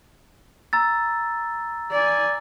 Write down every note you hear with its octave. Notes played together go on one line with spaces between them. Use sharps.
A#5 E6 A6
D5 G#5